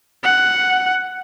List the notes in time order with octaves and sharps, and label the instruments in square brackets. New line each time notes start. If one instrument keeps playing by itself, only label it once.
[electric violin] F#5